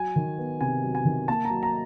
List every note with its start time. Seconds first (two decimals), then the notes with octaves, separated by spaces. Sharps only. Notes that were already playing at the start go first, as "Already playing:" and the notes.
Already playing: F#3 G#5
0.16 D#3
0.38 B3
0.61 C3 G#5
0.83 F#3
0.95 G#5
1.05 D#3
1.28 A#3 A5
1.45 A#5
1.50 F#3
1.63 A#5